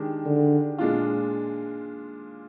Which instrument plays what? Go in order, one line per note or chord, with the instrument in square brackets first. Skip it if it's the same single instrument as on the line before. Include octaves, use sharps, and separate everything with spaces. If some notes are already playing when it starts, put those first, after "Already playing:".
Already playing: [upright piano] D#3 G#3 D4 G4
[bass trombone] D3
[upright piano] A#2 G#3 D4 F4